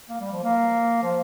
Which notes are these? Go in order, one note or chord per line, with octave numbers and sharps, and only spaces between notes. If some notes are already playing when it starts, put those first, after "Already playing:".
A#3
G3
F3
A#3
F3